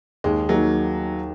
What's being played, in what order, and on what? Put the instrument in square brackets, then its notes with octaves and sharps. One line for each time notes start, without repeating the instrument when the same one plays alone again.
[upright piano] D#2 [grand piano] G#3
[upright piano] D#3 A#3 D#4 G#4 [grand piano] F#3